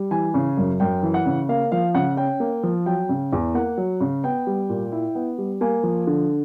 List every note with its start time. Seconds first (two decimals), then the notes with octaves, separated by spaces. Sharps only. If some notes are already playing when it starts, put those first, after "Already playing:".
Already playing: G3
0.11 E3 G#5
0.34 C#3
0.57 F#2
0.80 F#2 G5
1.03 E3
1.14 F#5
1.26 C#3
1.49 A#3 F5
1.72 F3 F5
1.94 C#3 F#5
2.17 C#4 G5
2.40 A#3
2.63 F3
2.86 F#3 G5
3.09 C#3
3.33 E2
3.55 A#3 F#5
3.77 F#3
4.01 C#3
4.24 B3 G5
4.47 G3
4.69 A#2
4.92 E4
5.15 B3
5.38 G3
5.61 A#3 G#5
5.83 F3
6.07 D3